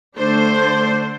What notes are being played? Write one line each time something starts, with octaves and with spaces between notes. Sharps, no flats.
D3 A3 D4 C5